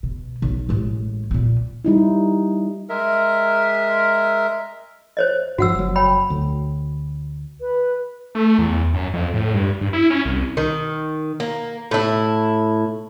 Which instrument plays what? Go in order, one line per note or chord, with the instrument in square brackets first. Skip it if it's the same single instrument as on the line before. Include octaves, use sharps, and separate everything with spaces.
[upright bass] B2
B1
A1 G#3
A#2 B3
[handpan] G3 D#4 E4
[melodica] G#3 A#4 E5
[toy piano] C5 C#5 D#5
[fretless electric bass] G2 F3 [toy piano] F#4 F#5 E6
[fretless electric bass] F#1 F#3
[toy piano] C#5 G5 B5
[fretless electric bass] D2
[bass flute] B4
[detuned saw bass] A3
E2
F#2
F2
A2
G2
G2
E4
C#4
C2
[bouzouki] D#3
A#3
A2 E4